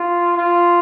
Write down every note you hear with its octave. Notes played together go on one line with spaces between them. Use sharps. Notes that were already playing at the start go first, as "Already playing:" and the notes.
Already playing: F4
F4